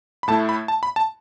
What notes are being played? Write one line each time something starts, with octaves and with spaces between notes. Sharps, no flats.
B5
A2 A3 E4 A5
B5
A5
B5
A5